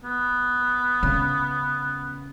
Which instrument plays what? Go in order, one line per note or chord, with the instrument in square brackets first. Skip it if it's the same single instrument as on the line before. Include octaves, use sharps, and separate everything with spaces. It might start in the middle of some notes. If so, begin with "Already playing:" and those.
[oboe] B3
[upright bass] C#3